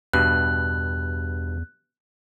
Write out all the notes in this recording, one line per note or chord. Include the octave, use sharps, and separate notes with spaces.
E2 G2 B2 G3 F#6